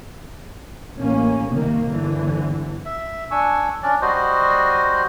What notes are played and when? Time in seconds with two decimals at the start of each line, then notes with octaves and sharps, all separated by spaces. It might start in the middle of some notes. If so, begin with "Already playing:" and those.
0.98 A1 A#3 C#4
1.50 C2 C3 D#3 A#3
1.89 G1 D3 E3
2.85 E5
3.31 D4 G#5 C#6 E6
3.83 C#4 D4 D5
4.02 G3 F#4 C5 D#5